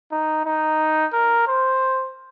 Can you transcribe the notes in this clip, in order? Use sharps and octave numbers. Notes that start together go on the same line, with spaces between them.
D#4
D#4
A#4
C5